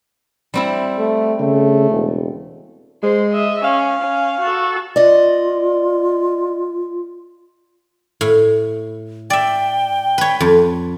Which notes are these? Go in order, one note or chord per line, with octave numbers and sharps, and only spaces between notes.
G3 C4 E4
A3
C#3 A3
E1
G#3 C5
D#5 E5
C#4 F5
C#4
F#4 A4
F4 D5 D#5
A2
D5 E5 G5
B4 C#5
F2